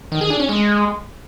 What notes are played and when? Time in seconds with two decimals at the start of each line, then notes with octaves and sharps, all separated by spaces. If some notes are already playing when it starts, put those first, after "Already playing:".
0.12 D#3
0.21 G#4
0.30 D4
0.40 C#4
0.49 G#3